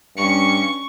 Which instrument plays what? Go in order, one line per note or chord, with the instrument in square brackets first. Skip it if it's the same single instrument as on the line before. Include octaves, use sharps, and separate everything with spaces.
[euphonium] G2 [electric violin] C#4 C#7 [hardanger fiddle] C#6